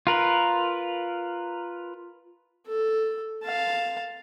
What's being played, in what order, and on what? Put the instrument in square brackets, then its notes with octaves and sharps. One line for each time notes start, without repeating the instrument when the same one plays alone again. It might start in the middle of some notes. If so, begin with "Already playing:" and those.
[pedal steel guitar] F4 A#4 B4
[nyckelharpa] A4
F5 A5